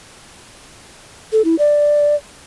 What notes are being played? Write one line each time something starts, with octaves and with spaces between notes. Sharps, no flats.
A4
E4
D5